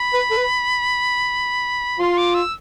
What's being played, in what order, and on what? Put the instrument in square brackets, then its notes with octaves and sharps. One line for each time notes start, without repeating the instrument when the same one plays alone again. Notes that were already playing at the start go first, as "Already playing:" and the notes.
Already playing: [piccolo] B5
[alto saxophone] B4
A4
B4
[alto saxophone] F4 [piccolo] C6
[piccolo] D6
E6